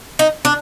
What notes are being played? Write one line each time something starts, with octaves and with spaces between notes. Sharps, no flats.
D#4
D4